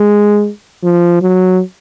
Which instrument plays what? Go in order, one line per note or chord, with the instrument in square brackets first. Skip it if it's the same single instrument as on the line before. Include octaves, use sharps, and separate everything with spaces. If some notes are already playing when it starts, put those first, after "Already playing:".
Already playing: [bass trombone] G#3
F3
F#3